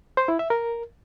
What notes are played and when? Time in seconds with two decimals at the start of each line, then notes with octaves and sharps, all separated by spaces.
0.17 C5
0.28 E4
0.39 E5
0.50 A#4